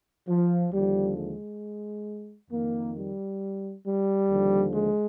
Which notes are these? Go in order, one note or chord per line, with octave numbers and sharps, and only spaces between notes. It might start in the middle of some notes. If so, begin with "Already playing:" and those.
F3
D#2 D3 F3 G3
G#3
F2 D#3 A#3
G3
G3
D#2 D3 F3
G#3